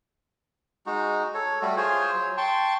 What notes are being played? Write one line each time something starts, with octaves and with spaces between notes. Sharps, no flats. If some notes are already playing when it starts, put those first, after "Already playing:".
G#3 D#4 F#4
A4 C#5
G3 A3 F#4
F4 G#4 C5 C#5
F#3 C#5
G5 A5 C6 C#6